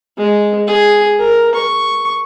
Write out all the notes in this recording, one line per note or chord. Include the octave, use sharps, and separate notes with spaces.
G#3
G#4
A#4
C#6